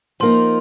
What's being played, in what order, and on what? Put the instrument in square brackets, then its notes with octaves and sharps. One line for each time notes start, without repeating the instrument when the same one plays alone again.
[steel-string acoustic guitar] F3 A#3 D#4 [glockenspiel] C6